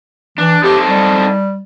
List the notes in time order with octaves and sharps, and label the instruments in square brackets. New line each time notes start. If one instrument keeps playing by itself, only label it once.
[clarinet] E3 [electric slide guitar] D4
[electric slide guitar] C4 D#4 A4 [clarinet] G4
[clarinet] G3